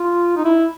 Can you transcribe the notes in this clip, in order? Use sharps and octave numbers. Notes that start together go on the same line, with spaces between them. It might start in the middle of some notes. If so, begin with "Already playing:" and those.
Already playing: F4
D#4
E4